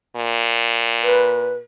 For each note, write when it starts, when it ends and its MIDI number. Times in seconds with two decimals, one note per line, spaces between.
0.16 1.59 46
1.03 1.53 71